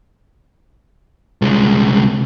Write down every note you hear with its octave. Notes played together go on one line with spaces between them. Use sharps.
C2 G#3